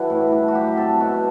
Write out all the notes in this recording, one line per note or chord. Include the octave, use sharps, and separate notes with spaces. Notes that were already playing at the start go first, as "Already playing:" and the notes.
Already playing: E3 G3 D4 E4 F#4
A2
D4
F#4
F#3 G4
C4 A4
B2 F#4